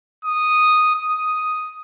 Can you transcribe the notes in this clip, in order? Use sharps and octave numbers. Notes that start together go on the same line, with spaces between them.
D#6
D#6